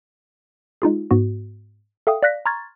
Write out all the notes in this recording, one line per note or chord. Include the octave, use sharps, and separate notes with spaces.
G#3 D#4 F4 G#4
G#2 B3 F#4
A4 E5 F5 G5 D#6
D5 F5 F#6 A#6 B6
A#5 C6 C#6 F6 G#6 A6